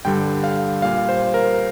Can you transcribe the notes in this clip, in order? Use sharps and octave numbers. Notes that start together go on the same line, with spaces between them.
G2 D3 G3 G5
F5
A#2 G3 F5
C5
A#4